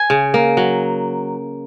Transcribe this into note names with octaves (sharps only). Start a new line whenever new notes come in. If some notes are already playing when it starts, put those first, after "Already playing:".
Already playing: G#5
C#3
A#3
F#3